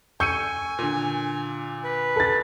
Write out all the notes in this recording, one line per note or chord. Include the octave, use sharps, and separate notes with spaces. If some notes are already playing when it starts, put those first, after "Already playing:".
G#5 C#6 E6 G6 C#7 D#7
A#2 D3
B4
A4 A6